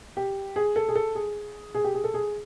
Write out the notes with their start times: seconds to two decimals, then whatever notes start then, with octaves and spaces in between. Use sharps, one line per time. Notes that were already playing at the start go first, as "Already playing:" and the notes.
0.17 G4
0.56 G#4
0.76 A4
0.88 G#4
0.96 A4
1.15 G#4
1.75 G#4
1.84 G4
1.95 G#4
2.04 A4
2.14 G#4